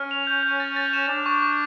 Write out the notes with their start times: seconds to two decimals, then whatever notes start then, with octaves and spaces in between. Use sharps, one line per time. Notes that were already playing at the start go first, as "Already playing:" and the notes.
Already playing: C#4 F6
0.11 F7
0.27 G6
0.43 G6
0.60 A6
0.76 A6
0.93 E7
1.09 D4 A6
1.26 C#6
1.42 C#6